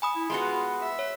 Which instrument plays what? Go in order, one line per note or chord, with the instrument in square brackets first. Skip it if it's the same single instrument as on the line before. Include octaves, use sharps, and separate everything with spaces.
[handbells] G#5 B5 D#6
[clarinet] E4
[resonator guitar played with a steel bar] G#3 B3 F#4 [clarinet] F4
[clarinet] E5
[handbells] C#5